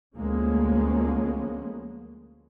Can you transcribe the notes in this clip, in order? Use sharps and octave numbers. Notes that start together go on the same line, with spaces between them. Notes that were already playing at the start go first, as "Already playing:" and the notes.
D2 F3 G#3 A#3 B3 C#4